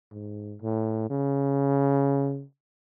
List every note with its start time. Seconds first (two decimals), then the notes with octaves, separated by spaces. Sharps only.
0.12 G#2
0.61 A2
1.10 C#3